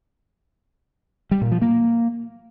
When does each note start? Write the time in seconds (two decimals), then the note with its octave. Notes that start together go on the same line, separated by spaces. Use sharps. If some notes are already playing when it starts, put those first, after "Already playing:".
1.31 G3
1.41 A#2
1.51 F3
1.62 A#3